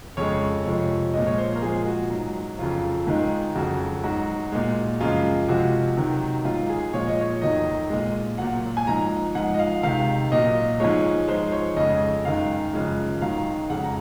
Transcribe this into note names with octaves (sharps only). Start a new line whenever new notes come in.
F2 C#3 G#3 C#5
F2 C3 F3 G#3 C#5
A#2 F3 G#3 D#5
C#5
C5
A#4
A#2 F3 G#3 G#4
F#4
G#2 F#3
F2 C#3 F#3 F4
G#2 D#3 G#3
F2 C#3 F#3 F#4
G#2 F#3 F#4
A#2 G#3
F#2 C#3 F3 G#3 F4
C3 F3 G#3 F#4
C3 D#3 F#3
G#2 F#3 F4
G#4
A#2 F3 G#3 C#5
D#5
C#5
F2 D#3 F#3 D#5
A#2 G#3
A#2 F#3 F#5
G#5
G#2 F3 G#3 A#5
G#2 F3 G#3 F#5
D#5
F5
C3 D#3 G#3 F5
A#2 F#3 D#5
G#2 F3 G#3 C#5
G#2 F3 G#3 C5
C#5
F2 C#3 G#3 D#5
F#2 D#3 G#3 F5
F#2 C#3 F3 G#3
G#2 D#3 F#3 F5
F2 C#3 G#3 F#5
A#5